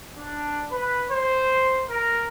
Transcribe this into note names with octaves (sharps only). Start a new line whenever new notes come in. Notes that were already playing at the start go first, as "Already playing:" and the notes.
D4
B4
C5
A#4